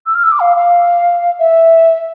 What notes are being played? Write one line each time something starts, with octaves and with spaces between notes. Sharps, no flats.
E6
F6
E6
D6
F5
F5
E5